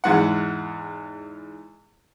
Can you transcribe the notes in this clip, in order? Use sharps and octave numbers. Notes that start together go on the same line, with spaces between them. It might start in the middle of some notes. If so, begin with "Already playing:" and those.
E2 G#2 F#5